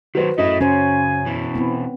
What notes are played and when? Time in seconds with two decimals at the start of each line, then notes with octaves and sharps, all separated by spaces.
0.15 D#3 F#3 F#4 B4 C5
0.38 F#2 A3 E4 D#5
0.61 C#3 C#4 C5 G#5
1.26 B2 E3
1.55 B3 C4 E4